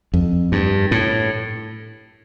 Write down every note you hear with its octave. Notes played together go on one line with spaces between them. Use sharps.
F2
G2
A2